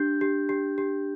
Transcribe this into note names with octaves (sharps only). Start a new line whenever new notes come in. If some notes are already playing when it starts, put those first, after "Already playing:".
Already playing: D4 G4 G6
G4
G4
G4